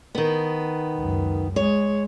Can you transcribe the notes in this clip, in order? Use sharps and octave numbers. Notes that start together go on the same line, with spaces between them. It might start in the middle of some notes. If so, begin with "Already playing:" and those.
D#3 B3
C#2 F#2
G#3 C#5